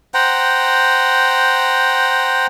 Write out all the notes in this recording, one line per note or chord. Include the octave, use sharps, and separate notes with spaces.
C5 F#5 G5 A#5